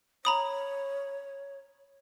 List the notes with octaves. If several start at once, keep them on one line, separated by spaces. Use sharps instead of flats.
C#5 A#5 B5 D#6